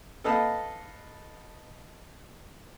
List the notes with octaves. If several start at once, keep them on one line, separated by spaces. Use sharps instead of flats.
A4 B4 D#5 F5 A5 B5